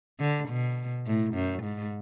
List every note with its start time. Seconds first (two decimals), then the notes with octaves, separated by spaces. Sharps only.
0.20 D3
0.49 B2
1.06 A2
1.34 F#2
1.63 G#2